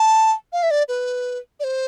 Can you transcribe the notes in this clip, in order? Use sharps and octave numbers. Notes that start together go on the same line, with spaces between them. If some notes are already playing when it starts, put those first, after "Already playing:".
Already playing: A5
F5
E5
D5
B4
D5
C5